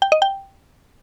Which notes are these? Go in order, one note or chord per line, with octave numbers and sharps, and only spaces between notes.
G5
D#5
G5